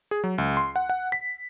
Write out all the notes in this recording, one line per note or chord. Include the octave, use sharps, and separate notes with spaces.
G#4
F#3
C#2
C6
F#5
F#5
B6